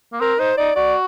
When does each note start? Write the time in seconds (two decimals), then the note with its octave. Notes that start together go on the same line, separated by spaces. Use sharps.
0.13 A#3
0.20 C4 A#4
0.39 D#4 C5
0.57 D#4 D5
0.76 F#4 D5